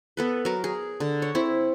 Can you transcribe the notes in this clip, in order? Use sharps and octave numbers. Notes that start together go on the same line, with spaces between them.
B3 A4 B4
F#3 A#4
G#4
D3
C#5
C4 E4